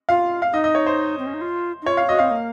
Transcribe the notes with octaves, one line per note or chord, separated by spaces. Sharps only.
F4 F5
F5
D#4 D#5
D#5
C#5
C5
C4
C#4
D#4
F4
D#4
F4 C#5
F5
F#4 D#5
C4 F5
A#3